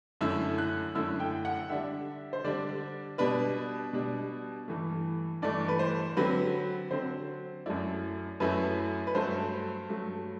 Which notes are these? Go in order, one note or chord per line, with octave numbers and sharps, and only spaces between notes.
F#2 D3 A3 E4 E6
F#6
F#2 D3 A3 E4 E6
G5
F#5
D3 G3 D4 E5
C5
D3 G3 D4 D5
B2 G3 D4 B4
B2 G3 D4
G2 E3 A3
G2 E3 A3 D5
B4
C5
D3 F#3 C4 B4
D3 F#3 C4 C5
F#2 F#3 A3 E4 D5
F#2 F#3 A3 E4 B4
B4
G2 F#3 A3 C5
G2 F#3 A3